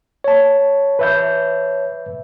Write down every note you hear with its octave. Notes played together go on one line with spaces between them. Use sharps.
C#5 A5
B4 E5 G6